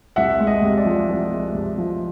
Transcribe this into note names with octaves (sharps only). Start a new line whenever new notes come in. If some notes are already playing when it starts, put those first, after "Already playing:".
C2 E5 F#5
G#3
D#5
C3
D5
F3
C2
G#3
C3
F3